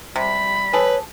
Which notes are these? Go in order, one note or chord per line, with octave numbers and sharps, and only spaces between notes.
C3 G3 B5
G#4 A4 B4 C#5